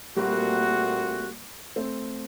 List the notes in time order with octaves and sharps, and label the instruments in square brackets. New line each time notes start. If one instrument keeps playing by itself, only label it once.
[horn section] A#2 A3 C4 F#4 [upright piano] G3 A#3
[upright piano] A3 C4